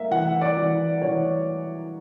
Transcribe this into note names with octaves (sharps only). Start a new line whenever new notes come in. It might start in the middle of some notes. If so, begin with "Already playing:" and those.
Already playing: A#3 E5
E3 F#5
D5
E3
E3 C#5